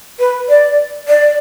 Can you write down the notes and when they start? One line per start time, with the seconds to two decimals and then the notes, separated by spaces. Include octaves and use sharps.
0.19 B4
0.49 D5
1.08 D5